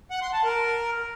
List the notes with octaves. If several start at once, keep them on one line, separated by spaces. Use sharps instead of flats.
F#5
C6
A5
A#4